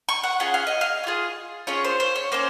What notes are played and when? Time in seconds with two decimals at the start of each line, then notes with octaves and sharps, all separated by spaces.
0.09 C#6
0.24 F#5
0.40 C#4 F4 G#4 F#5
0.54 F5
0.67 D#5
0.81 F5
1.04 C#4
1.07 F4 G#4
1.67 C#4 F4 G#4 C#5
1.85 C5
2.00 C5
2.16 C#5
2.32 A#3 C#4 C5